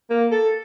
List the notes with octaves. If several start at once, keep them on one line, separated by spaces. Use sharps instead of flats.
A#3
A4